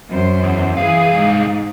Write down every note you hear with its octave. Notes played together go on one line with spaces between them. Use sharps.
F#2 C5
E2
C2 E3 G#4 F5
G#2